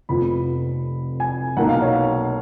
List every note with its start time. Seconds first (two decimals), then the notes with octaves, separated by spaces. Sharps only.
0.09 F1 F2 F3 B3 B5
1.20 G#5
1.57 B1 B2 A#3 D#4 F#5
1.69 F5
1.82 C#5